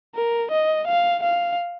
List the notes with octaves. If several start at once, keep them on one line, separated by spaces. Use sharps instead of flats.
A#4
D#5
F5
F5